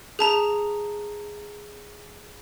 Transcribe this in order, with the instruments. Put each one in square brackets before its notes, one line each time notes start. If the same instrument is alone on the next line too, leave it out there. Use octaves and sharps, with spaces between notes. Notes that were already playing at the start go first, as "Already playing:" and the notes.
[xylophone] G#4 A5 A#5